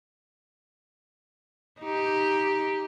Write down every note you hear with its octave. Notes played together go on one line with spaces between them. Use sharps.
D#4 G4